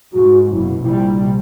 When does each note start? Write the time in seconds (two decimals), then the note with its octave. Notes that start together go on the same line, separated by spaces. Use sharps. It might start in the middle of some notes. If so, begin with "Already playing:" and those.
0.13 G#2 F#4
0.51 F#1 B2 E4
0.82 A#1 C3 G3 E4